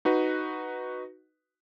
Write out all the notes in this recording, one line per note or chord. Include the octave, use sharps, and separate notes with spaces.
D#4 F#4 B4